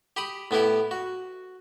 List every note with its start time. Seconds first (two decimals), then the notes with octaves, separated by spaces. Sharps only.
0.17 G4 B5 D#6
0.51 A2 B3 E4 G4
0.91 F#4